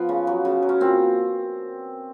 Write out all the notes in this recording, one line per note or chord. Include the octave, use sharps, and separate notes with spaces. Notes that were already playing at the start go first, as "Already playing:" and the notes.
Already playing: F3 B3
C#3
F#3
C#3
F#3
C#4
A#2 C4